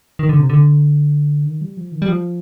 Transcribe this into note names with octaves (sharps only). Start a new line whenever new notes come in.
D#3
D3
C3
D3
D#3
G3
F3
D#3
G3
F3